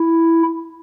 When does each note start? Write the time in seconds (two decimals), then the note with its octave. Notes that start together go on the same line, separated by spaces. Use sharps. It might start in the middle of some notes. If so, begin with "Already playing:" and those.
Already playing: E4